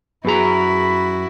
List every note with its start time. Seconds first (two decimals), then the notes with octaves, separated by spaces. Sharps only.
0.25 F#2 B3 E4 F#4 G#4 A#5 B5